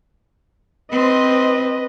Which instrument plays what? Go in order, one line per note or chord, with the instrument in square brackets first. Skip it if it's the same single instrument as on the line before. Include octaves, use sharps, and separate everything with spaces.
[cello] C4 C5 [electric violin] B4 D#5